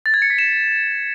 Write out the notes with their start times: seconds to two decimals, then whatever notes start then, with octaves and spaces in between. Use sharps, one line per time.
0.06 A6
0.14 G#6
0.22 C#7
0.30 B6
0.39 E7